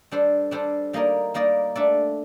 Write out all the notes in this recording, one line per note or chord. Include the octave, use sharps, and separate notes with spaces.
G3 D4 A4 C5
G3 D4 A4 C5
G3 A#3 D#4 A#4 D5
G3 A#3 D#4 A#4 D5
A3 D4 A4 D5